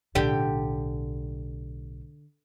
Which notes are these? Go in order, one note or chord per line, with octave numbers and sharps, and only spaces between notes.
B1 A2 D3 G4 G5